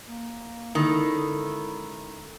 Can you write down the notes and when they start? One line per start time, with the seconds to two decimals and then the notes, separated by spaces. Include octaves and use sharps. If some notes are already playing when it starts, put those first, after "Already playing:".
0.07 A#3
0.75 D3 D#3 G#3 C#4 E4